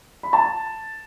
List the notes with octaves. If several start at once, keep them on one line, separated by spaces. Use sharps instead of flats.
B5
A5